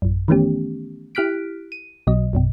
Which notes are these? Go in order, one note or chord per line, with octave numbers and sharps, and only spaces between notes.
A1 F#2
D#3 E3 A3 B3 C#4 G4
E4 G4 F6 F#6 B6 D7
D#7
B1 B2 F#3 D#5
A#1 F#2 B2